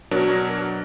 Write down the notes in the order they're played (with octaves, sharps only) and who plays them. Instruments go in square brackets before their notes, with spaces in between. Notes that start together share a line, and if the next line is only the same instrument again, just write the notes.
[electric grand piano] B2 F#3 D4 A#4 C#5